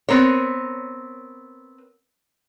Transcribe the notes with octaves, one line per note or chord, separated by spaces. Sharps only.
B3 C4 A#4 C#5